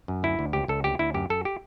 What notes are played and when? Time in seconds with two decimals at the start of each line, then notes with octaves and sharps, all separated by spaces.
0.08 F#2
0.23 D2 E4
0.39 D2
0.53 C#2 G4
0.68 C#2 A4
0.84 D2 G4
0.99 D2 E4
1.14 F#2 G4
1.29 F#2 A4
1.45 G4